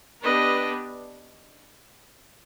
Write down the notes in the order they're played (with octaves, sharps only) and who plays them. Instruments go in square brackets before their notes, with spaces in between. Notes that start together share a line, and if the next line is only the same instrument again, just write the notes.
[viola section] B3 D4 G4 B4 [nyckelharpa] D#5